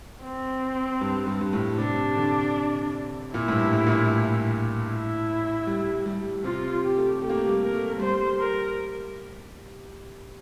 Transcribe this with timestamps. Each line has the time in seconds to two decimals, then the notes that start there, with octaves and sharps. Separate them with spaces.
0.23 C4
1.01 G2
1.27 G2
1.41 G2
1.53 A2
1.78 C3 D4
2.17 D3
3.33 A#2 E4
3.48 A2
3.53 G2
3.73 A2
3.87 A#2
3.92 A2
4.89 E4
5.67 G3
6.06 G3
6.44 C3 F4
6.84 G4
6.97 A3
7.22 A3 G4
7.30 A#3
7.37 A3
7.48 G3
7.62 A#4
7.74 A3
7.99 G3 C5
8.39 A#4